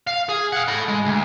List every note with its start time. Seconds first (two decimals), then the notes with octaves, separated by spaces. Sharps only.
0.07 F5
0.29 G#4
0.52 F5 F#5
0.68 A4 B5
0.88 G#3
1.05 D2